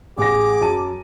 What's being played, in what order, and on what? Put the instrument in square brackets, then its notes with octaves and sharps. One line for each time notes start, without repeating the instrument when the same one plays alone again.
[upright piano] A1 A#6 [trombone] G#4 [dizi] D6
[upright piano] F#2 A5 D#7